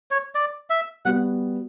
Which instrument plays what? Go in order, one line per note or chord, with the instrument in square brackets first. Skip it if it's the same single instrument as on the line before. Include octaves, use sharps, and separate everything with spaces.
[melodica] C#5
D5
E5
[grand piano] G3 B3 F#4 [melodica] F#5